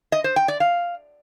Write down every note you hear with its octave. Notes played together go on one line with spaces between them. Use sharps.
D#5
C5
G5
D5
F5